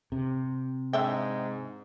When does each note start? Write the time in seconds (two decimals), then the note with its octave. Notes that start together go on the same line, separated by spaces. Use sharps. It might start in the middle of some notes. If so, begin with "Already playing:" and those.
0.12 C3
0.93 G#2 D4 E5 G5